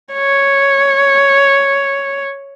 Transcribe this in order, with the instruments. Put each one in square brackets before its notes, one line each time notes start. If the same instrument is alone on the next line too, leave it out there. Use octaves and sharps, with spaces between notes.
[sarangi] C#5